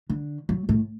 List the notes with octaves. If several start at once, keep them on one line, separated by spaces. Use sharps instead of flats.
D3
F#3
A2